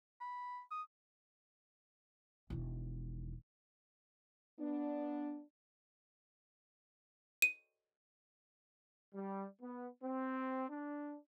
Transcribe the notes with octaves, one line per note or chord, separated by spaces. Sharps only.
B5
D#6
E1 D#3
B3 D4
D#7
G3
B3
C4
D4